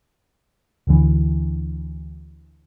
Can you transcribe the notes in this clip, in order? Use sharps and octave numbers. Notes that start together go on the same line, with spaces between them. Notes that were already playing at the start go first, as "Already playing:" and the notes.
D2 D3 E3